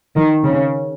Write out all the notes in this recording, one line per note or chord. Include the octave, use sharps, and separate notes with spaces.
D#3
C#3